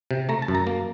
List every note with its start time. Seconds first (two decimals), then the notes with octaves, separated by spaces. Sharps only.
0.11 C3
0.29 A3 A#5
0.42 A5
0.48 F#2
0.55 A#5
0.67 A#3